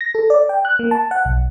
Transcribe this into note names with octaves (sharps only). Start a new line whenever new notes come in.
A#6
A4
D5
G5
F#6
A#3
A5
F#5
B1